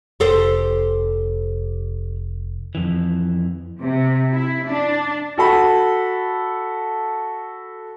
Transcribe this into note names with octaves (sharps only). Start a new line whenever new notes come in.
F1 G4 A4 C5
F2 E3
C3
E4
D4
F#4 A4 B5